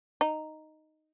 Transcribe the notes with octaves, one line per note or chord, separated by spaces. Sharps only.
D#4